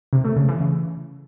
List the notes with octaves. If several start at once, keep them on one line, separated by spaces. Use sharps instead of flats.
C3
A3
C#3
E3
C#3